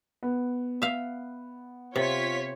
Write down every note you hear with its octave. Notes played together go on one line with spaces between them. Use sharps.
B3
E5 F5
C3 F4 C#5 B6